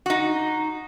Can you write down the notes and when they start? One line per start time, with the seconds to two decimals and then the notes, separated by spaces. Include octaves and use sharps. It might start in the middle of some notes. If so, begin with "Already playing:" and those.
0.06 D#4 F#4